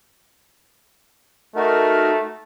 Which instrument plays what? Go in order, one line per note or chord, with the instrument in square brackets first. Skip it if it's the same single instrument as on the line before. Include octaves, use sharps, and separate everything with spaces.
[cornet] A3 [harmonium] D#4 F#4 A#4